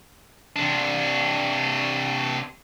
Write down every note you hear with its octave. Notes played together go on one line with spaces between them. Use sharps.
C3 D4